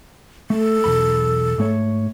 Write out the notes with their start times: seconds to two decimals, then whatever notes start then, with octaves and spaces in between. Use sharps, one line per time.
0.50 A3 A4
0.84 B1 E2 B5
1.58 G#2 A3 C#5